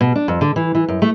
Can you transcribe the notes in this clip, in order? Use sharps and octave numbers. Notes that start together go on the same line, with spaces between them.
B2
D4
F2
D3
E3
E3
F#2
A3